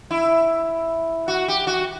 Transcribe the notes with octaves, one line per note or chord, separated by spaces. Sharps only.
E4
F#4
G4
F#4